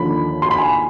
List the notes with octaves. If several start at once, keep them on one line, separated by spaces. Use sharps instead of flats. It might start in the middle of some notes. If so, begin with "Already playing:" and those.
Already playing: D#2 D3 F3 B5
C6
B5
G#5